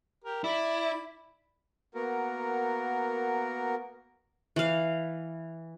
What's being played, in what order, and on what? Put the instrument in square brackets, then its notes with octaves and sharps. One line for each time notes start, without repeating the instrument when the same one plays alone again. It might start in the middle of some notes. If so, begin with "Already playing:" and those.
[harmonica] G4 A#4
[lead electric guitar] E4 [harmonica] D5 B5
[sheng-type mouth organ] A#3 B3 F#4 A#4
[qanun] E3 F5